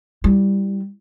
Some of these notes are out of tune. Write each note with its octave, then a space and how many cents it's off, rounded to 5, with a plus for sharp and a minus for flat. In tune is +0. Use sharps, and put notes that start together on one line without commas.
G3 +0 E4 +0